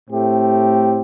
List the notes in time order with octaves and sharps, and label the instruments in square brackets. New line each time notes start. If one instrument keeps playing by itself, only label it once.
[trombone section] A2 A3 C4 G4